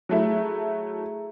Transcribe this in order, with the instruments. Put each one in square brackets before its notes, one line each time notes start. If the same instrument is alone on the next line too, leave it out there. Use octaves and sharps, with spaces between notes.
[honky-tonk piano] F#3 A3 E4 [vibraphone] G#4 E5 A#5